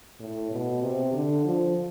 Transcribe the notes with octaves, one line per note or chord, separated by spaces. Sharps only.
A2
B2
C3
D3
F3